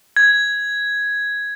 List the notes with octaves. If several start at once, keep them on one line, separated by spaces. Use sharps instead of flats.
G#6